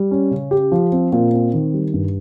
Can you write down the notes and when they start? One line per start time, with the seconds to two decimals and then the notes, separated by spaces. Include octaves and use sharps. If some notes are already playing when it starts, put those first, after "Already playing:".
Already playing: G3
0.11 C#4
0.31 C#3
0.51 G4
0.72 F3
0.92 C4
1.12 A#2
1.33 C4
1.54 D#3
1.74 G3
1.94 G2